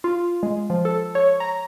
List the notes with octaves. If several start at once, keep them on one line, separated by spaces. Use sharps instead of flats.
F4
G#3
F3
A4
C#5
A#5